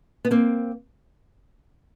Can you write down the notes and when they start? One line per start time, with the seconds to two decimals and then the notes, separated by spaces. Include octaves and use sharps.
0.25 B3
0.31 A#3 C4